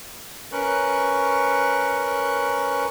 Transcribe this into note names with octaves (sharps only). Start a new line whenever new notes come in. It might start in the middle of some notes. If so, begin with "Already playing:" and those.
C#4 A#4 B4 C#6 F#6